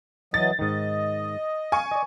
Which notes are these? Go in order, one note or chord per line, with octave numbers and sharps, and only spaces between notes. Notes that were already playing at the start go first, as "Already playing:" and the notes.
E3 F#3 D#5 A6
G#2 D#3 D#5
F5 G#5 C#6
D5 D#5